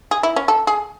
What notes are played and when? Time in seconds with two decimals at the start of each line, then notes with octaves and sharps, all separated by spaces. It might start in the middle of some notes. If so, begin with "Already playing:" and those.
0.11 G#4
0.23 E4
0.36 C#4
0.48 A4
0.67 G#4